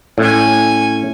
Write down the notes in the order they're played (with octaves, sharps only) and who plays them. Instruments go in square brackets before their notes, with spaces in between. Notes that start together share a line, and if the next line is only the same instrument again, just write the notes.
[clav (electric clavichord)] A2 [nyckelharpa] C#4 G#5